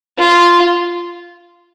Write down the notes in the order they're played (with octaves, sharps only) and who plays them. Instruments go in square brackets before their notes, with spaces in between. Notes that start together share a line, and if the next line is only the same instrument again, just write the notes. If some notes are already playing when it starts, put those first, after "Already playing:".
[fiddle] F4